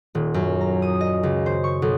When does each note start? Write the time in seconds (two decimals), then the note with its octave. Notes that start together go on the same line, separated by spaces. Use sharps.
0.15 D#1
0.34 F#2
0.61 A#5
0.82 D#6
1.01 D#5
1.23 C#2
1.46 C5
1.64 C#6
1.82 B1